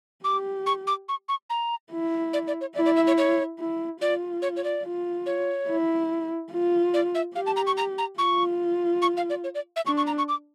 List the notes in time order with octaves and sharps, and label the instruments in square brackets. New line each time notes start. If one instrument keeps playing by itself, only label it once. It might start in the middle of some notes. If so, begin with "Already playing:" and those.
[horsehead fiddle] G4 [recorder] D6
[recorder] C#6
D6
C#6
C#6
A#5
[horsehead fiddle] E4
[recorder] D5
D5
C#5
[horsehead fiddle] E4 [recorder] D5
[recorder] D5
E5
C#5
C#5
[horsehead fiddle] E4
[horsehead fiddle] F4 [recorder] D5
[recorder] C#5
C#5
D5
[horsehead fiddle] F4
[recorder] C#5
[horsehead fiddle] E4
F4
[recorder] D5
E5
[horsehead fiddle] G4 [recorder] F5
[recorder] A5
A#5
C#6
A#5
A#5
[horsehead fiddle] F4 [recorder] C#6
[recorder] C#6
F5
D5
C#5
D5
E5
[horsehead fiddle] D4 [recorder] C#6
[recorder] C#6
A#5
C#6
D6